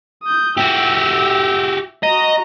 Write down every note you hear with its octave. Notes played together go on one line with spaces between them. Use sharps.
D#6 G6
F#4 G4 E5 E6
F#4 D#5 A#5